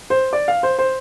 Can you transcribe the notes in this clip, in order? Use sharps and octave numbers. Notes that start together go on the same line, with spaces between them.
C5
D5
F5
C5
C5